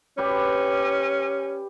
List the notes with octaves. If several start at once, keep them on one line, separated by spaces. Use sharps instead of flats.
C#4 G4 B4 D5